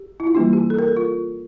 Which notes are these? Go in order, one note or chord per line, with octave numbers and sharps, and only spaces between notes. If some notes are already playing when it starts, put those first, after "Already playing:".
Already playing: G4
E4
F4
E3 G3 A#3 D4 G4
G4
A4
A#4
A4
F4